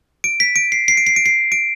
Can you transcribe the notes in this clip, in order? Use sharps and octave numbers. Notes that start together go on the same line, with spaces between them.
D7
B6
D7
C7
C7
D7
C7
D7
C7
D7